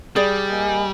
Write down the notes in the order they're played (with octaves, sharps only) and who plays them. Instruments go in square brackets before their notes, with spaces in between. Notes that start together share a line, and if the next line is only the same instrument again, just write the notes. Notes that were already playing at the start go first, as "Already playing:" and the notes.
[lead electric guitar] G3 [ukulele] G#4 D5
[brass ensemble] A#3 D#5 G#5